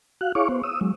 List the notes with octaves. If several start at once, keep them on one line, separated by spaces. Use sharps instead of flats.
F#4 F5 F#6
E4 G#4 C#5 F5 C#6 D6
B3 C5
D#6 E6
F#3 G#3